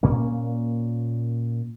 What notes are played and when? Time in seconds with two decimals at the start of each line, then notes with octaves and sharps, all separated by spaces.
0.03 A#2 A#3 C#4